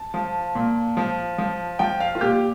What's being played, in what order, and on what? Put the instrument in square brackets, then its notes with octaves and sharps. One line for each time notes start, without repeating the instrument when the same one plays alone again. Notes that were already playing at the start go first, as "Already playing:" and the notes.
Already playing: [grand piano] A5
F3
A#2
F3
F3
F3 G5
F5
F4
A#2 G4